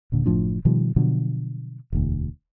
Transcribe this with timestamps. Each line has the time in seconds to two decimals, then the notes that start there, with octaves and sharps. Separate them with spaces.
0.12 D#1 A#2 D3
0.26 F#1 A2 F3 D4
0.65 B2 D#3 F3 G3
0.96 B2 D3 F3 F#3
1.93 E1 D2